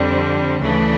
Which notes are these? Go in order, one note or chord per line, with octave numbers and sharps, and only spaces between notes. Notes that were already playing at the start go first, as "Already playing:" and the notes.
Already playing: F2 D3 G3 C4
D2 C#3 E3 A3 D4